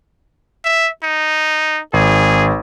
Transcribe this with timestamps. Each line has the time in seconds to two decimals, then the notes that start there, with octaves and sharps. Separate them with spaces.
0.65 E5
1.03 D#4
1.93 G#1 G#4